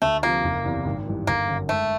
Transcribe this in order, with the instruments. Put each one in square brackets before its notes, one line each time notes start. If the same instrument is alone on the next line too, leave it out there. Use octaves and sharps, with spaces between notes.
[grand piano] D2 [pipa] A3
[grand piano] C3 F3 [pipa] A#3
[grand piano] F#1
E2 C3 E3
G#1
G2 E3
[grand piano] G1 [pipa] A#3
[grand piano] F#2 D3
[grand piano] G#2 [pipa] A3